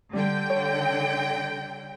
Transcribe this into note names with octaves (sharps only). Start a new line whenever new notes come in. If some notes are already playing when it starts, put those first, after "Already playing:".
D3 G3 G5
C#5